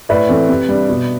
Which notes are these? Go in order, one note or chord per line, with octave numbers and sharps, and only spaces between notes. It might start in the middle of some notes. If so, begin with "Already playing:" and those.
A2 B4 D5
E3 A3 C4
C3
G3 D4
B2